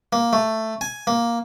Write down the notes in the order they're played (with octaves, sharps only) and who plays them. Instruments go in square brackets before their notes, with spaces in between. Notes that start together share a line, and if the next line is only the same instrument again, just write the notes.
[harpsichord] A#3
A3
G#5
A#3